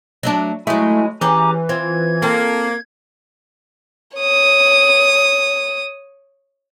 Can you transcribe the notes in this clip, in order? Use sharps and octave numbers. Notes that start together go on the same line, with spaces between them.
F#3 A3 D4
F#3 G#3 A3 E4 G#5
E3 C#4 G4 G#4 G#5 A#5 D6
C4 F4 G#6
A#3 C4 A4
C#5 D#6